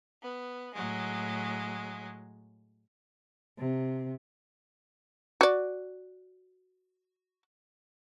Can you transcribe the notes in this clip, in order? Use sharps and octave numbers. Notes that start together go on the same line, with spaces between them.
B3
A2 F#3 G#3
C3
F#4 D5